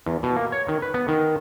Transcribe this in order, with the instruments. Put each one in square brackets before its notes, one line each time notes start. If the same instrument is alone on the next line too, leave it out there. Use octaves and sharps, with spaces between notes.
[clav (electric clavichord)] E2
B2
A#3
C#5
D#3
B4
B3
D#3